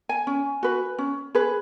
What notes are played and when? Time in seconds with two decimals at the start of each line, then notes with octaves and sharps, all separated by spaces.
0.09 G#5
0.27 C#4
0.63 F#4 B4
0.98 C#4
1.35 G#4 B4